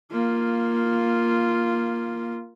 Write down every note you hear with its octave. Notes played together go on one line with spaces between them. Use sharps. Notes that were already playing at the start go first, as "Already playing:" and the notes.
A#3 F4